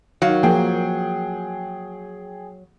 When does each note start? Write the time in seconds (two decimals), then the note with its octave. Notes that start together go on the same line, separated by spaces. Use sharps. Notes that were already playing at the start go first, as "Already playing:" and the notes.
0.22 D#3 F#3 F5
0.43 F3 A#3 F4 G#4 G5